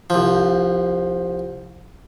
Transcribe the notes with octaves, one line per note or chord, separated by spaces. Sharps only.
C2 F3